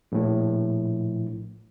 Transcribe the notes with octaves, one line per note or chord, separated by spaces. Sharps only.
A#1 A2